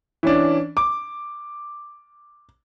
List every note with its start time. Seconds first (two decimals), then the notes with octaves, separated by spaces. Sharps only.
0.23 E3 C#4 D4
0.77 D6